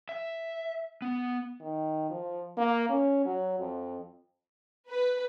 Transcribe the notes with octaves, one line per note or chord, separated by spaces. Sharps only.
E5
B3
D#3
F3
A#3
C#4
F#3
F2
B4